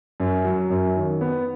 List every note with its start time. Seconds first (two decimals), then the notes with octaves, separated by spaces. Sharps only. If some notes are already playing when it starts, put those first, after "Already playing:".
0.20 F#2
0.45 F#3
0.70 F#2
0.95 D#3
1.21 B3